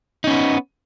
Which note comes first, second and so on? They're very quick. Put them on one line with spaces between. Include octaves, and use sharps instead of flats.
D#4 C#4 B3